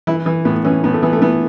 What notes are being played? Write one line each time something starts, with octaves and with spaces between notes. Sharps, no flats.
E3 E4
E3
A2 B3
E3 C#4
A2 B3
A3
E3 B3
A3
E3 B3